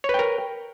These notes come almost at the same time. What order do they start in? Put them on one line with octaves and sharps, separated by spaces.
C#5 B4 G5 A#4